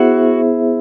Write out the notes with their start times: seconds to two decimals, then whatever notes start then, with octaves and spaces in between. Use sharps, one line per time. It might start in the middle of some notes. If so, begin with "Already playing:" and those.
Already playing: B3 E4 F#4 G#4 C5 E5